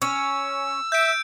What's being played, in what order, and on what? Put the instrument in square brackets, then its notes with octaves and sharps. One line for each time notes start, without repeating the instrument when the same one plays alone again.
[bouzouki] C#4 [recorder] E6
[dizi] E5 [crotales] G6 D7